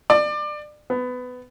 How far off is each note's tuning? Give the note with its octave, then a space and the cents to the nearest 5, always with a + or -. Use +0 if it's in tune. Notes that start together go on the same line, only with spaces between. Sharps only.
D5 +25
B3 +20